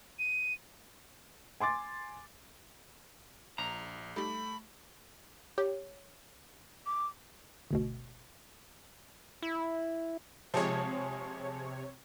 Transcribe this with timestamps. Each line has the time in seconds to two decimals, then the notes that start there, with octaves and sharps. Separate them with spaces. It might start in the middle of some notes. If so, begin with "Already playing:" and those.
0.19 D#7
1.60 G#5 C6 D6 A6
3.58 A#1 A#5
4.16 G3 A3 D#4 G4 B5
5.58 G4 C#5
6.86 D6
7.71 G1 D2 B2
9.42 E4
10.54 C3 F3 G#3 C#5